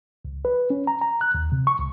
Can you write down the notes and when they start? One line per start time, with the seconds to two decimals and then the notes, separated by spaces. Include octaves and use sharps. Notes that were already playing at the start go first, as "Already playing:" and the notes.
0.25 C#2
0.45 B4
0.70 C#4
0.87 A#5
1.01 A#5
1.21 F#6
1.34 D#2
1.52 C3
1.67 C#6
1.78 C#2